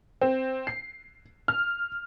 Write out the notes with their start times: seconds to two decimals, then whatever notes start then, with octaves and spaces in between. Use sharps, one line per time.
0.22 C4
0.67 C7
1.48 F6